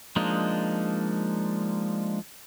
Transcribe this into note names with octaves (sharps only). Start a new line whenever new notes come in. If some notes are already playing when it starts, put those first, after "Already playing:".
F3 G#3 A#3 D4 D#4